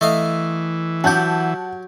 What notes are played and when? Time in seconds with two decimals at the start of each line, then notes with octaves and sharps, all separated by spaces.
0.01 E3 A3 D#5 F5
1.04 F#3 G4 F#5 A5 G6